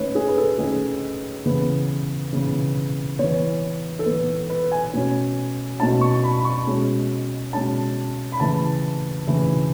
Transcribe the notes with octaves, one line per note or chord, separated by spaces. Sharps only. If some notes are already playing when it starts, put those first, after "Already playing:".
Already playing: D#3 A3 C#4 B4 C#5
G#4
B4
A4
D#3 A3 C#4 G#4
C#3 E3 B3
C#3 E3 B3
E3 B3 C#5
A4
E3 B3 B4
B4
G#5
B2 A3 C#4
B2 A3 C#4 A5
C#6
B5
B5
C#6
B2 G#3 C#4
B2 G#3 C#4 A5
B5
C#3 E3 A3 A5
C#3 E3 A3